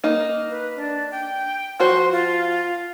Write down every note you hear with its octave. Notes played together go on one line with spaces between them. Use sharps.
A#3 D#4
B4
D4
G5
F3 F#4 C5 C6
F4